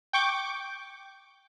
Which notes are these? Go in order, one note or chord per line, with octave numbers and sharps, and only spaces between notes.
G5 C#6 D6